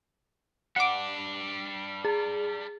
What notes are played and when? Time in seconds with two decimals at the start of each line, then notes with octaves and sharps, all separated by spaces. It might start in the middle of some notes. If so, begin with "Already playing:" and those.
0.76 G3 D4 F#5 D6
2.05 G#4